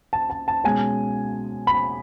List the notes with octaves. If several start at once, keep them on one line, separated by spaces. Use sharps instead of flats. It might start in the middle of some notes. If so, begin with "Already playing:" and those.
A5
A5
A5
B2 G#3 C#4 G#5
B5